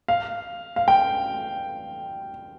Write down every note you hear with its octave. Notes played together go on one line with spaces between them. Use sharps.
F5
F5
G5